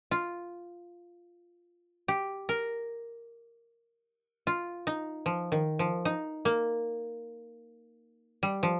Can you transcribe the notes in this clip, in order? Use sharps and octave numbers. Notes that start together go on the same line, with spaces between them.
F4
G4
A#4
F4
D#4
F3
D#3
F3
D#4
A#3
G3
F3